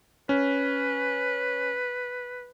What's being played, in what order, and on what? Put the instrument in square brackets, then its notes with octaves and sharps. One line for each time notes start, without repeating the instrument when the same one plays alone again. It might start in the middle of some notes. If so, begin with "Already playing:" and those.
[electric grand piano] C#4 [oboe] B4